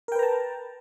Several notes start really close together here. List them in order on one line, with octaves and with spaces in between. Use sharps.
A#4 G5 B4 A#5 A5